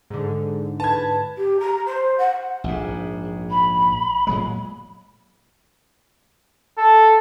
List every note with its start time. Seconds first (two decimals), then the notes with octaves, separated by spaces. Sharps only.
0.10 G#2 D3
0.80 B4 A5 G#6
1.38 G4
1.60 A#5
1.86 C5
2.18 F#5
2.64 A#1 G#2
3.51 B5
4.27 A#2 F#3 G#3
6.78 A4